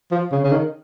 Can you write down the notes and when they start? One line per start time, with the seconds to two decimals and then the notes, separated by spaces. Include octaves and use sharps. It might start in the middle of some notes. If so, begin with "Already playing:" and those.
0.11 F3
0.32 C#3
0.43 C#3
0.51 D#3